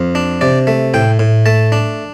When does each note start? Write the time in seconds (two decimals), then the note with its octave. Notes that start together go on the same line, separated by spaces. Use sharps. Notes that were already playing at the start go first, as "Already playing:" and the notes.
Already playing: F2
0.15 D4
0.41 C3 D5
0.67 A3
0.94 A2 G5
1.19 A2
1.46 A3 A5
1.72 D4